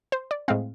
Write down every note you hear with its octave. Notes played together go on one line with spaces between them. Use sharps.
C5
D5
A2 G#3 C4 F5